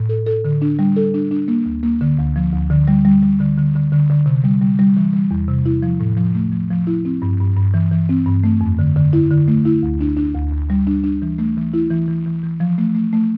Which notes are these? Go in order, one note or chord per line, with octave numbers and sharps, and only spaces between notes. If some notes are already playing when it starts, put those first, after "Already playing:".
Already playing: A2
A4
A4
D3
D4
G3
A4
D4
D4
A#3
D2
A#3
D3
D2
F3
D2
D3
G3
G3
G3
D3
D3
D3
D3
D3
C3
G3
G3
G3
E3
G3
E2
C3
E4
F3
A2
F3
A3
F3
F3
E4
C4
G2
G2
G2
E3
E3
C4
G2
A3
F2
D3
D3
E4
D3
A3
E4
D2
D4
D4
D2
D2
G3
D4
D4
E3
A3
E3
E4
E3
E3
E3
E3
F3
A3
A3
A3